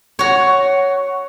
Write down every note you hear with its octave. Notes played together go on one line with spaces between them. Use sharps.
F#4 C#5